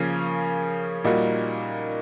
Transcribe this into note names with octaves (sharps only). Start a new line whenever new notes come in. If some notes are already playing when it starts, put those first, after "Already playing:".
Already playing: C#3 F3 A#3 C#4
A#2 G3 A#3 D#4 F#4